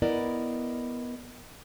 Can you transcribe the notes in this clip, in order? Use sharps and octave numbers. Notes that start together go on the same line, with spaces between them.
B3 E4 A#4 D5 D#5